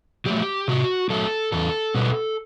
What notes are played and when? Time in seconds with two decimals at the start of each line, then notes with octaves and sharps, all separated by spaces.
0.26 F#3 A3 G4
0.68 C3 F#4
1.10 F#3 A3 A4
1.52 E2 A4
1.95 B2 G3 B3